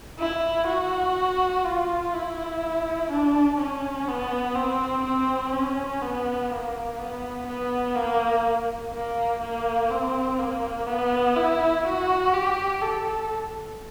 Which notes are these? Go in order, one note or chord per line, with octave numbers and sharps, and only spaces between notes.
E4
F#4
F4
E4
D4
C#4
B3
C4
C4
C#4
B3
A#3
B3
B3
A#3
A#3
A#3
C4
A#3
B3
E4
F#4
G4
A4